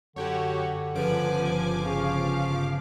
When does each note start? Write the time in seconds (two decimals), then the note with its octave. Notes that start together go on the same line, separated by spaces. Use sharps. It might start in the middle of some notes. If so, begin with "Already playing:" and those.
0.16 F#2 D3 F#4 G4 C#5
0.95 G1 C#3 F3 B4 G#5 D6
1.86 C#3 C#4 F5